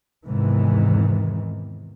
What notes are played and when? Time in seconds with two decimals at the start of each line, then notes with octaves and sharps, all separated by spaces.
0.25 E2 G#2 C3 D#3 E3